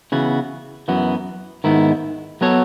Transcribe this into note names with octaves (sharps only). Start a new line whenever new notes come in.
C#3 E3 B3 F#4
F#2 E3 B3 F#4
G#2 D#3 G#3 B3 E4
F#3 B3 F#4 A4 C#5